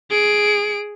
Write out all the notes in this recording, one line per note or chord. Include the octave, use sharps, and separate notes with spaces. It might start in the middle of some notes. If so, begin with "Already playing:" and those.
G#4 D7